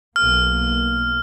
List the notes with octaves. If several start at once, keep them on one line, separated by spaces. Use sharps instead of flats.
B1 A#3 F6